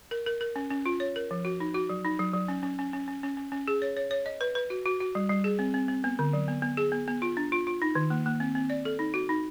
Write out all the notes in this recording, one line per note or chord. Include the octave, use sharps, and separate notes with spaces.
A#4
A#4
A#4
C#4
C#4
F4
C#5
A#4
F3
F#4
D#4
F#4
F#3
D#4
F#3
F#3
C#4
C#4
C#4
C#4
C#4
C#4
C#4
C#4
G#4
C#5
C#5
C#5
D#5
B4
B4
F#4
F#4
F#4
G3
G3
G#4
C4
C4
C4
B3
D3
F#3
B3
B3
G#4
B3
B3
F4
D4
F4
F4
D#4
D#3
A#3
A#3
C4
C4
D5
A4
D#4
F#4
D#4